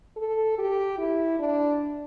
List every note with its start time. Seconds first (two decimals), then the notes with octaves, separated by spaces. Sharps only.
0.17 A4
0.58 G4
0.98 E4
1.39 D4